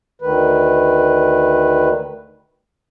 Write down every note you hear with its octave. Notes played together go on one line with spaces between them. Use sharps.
D2 D#3 B4